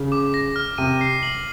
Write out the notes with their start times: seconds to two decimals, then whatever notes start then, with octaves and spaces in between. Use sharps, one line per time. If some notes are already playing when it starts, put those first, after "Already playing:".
Already playing: C#3
0.12 D6
0.34 A#6
0.56 F6
0.78 C3 D#7
1.01 C7
1.23 F#7